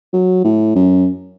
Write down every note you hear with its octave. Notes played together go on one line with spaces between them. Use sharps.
F#3
A2
F#2